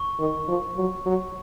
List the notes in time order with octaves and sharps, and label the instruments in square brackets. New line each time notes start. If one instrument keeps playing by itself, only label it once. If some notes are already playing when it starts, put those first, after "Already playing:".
Already playing: [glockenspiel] C#6
[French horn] D#3
F3
F#3
F#3